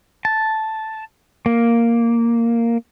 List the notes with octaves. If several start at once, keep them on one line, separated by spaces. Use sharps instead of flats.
A5
A#3